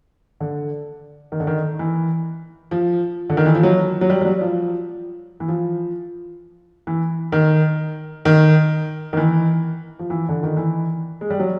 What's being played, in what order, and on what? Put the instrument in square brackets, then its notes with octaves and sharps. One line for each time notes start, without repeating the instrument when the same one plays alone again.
[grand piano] D3
D#3
D3
D#3
E3
F3
D3
D#3
E3
F3
F#3
F#3
G3
G3
F#3
F3
E3
F3
E3
D#3
D#3
D#3
E3
F3
E3
D3
D#3
E3
G#3
G3
F#3